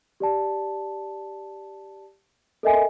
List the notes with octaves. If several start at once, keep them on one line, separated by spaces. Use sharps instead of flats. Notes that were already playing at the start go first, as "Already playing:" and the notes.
G4 D5 A5
A4 A#4 D#5 E5 G#5